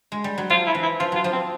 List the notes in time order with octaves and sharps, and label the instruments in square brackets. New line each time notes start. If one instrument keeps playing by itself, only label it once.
[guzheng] G#3
G3
F#3
[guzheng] F3 [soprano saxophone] F4
[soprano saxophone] E4
[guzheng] E3
[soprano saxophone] E4
[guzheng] F3 [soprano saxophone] F4
[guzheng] F#3 [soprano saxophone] F4
[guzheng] F3
[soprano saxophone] C4